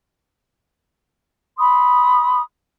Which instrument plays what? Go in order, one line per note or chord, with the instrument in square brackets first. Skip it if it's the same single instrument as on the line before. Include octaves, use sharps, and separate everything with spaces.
[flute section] B5 C6 D#6